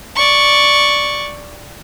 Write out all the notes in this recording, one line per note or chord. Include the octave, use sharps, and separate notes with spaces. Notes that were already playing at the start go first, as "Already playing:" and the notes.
D5 C#6